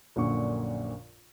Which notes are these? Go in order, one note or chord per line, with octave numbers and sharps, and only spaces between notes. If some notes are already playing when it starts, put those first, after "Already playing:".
A#1 F#2 A#2 D3 C#6